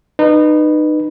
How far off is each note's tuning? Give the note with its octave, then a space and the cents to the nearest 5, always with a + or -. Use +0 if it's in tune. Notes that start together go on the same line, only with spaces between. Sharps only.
D#4 -30 B4 -5